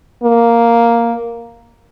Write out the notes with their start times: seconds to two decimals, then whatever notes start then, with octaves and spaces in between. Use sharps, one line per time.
0.24 A#3